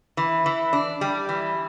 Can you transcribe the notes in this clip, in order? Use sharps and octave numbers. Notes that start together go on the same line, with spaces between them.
E3
E3
D4
G3
E3